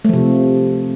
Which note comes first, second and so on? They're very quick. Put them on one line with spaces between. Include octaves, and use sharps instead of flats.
A3 F3 C3